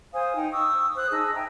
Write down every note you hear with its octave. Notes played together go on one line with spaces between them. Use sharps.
C5 F5 G#5 D#6
D#4 G5
C#6 D#6 E6
C5 D#6 F#6
D#4 G#4 A5 E6
E5 G5 G#5 A#5